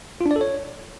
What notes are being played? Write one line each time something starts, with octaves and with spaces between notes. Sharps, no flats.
F4
D4
D5
A4
C#5